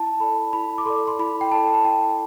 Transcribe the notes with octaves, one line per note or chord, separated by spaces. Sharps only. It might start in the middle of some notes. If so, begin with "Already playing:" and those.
Already playing: E4 A5
A4 D5 B5
E4 B5
D6
A4 D5 C6
C6
E4 B5
G5
A4 D5 A5
A5
E4 G5